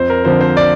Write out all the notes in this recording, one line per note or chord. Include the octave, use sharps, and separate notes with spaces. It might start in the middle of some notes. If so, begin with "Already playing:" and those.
Already playing: F2 C5
A#4
D3 F3 C4 C5
C5
D5